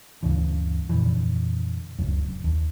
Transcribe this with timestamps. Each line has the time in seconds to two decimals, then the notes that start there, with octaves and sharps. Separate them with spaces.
0.23 D2 G2 C#3 E3
0.89 F2 A#2 D3 E3
1.99 D1 C#2 F#2
2.44 D#2